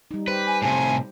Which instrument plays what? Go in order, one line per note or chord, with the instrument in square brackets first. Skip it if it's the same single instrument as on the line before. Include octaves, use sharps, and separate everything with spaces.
[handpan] G3 D#4
[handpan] G4 C5 [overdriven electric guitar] B4
[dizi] G#5
[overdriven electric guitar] A2 C3 [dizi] G#5